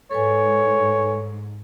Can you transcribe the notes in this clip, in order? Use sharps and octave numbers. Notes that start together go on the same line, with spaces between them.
G#2 A4 B4 C#5 G#5